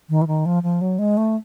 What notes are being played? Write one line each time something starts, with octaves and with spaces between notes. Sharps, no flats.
D#3
E3
D#3
F3
F3
F#3
G#3
A3